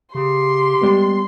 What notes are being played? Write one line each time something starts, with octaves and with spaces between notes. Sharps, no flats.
C#3 G4 C6
G3 G#3 B3